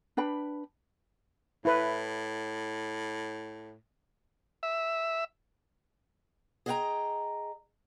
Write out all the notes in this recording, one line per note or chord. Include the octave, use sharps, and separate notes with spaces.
D4 B4 G5 B5
A2 E4 B4
E5
G#4 D#5 E5 F#5 G5 A#5